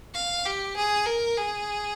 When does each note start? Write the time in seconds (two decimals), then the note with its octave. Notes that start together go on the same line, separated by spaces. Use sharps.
0.14 F5
0.46 G4
0.76 G#4
1.06 A#4
1.37 G#4